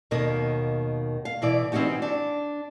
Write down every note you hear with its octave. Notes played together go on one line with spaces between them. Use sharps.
D#2 B2 D#3 A#3 D#5
F5
B2 E3 E4 D5
E3 C4 C#4 D#4 F#4 G4
D4